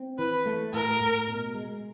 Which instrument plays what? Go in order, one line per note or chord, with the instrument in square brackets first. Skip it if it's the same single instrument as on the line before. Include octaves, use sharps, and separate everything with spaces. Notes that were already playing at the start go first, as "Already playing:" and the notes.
Already playing: [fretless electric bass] C4
[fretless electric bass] E3 [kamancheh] B4
[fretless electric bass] A3
[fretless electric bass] A2 [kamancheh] A#4
[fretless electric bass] A2
B2
G#3